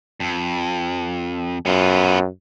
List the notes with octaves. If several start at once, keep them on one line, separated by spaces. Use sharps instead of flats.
F2
F#2 B3 F4